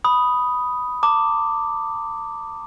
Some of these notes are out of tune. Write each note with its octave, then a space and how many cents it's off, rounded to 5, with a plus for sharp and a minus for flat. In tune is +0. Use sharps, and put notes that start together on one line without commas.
B5 +0 D#6 +0
A5 +40 D6 +0